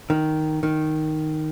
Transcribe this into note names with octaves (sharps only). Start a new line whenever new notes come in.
D#3
D#3